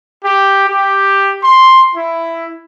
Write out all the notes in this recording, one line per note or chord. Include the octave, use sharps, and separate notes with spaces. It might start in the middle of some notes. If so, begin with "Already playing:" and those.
G4
G4
C6
E4